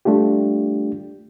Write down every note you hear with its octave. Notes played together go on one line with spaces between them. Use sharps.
G3 A3 D4 F4 G4